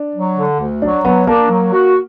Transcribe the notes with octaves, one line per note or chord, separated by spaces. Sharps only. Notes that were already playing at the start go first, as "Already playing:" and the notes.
Already playing: D4
F#3
D3
D2
F#3 D4
F#3 B3
A#3 D4
F#3
F#4